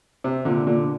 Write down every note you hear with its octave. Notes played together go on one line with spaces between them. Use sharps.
C3
A#2 D3
A#2 D3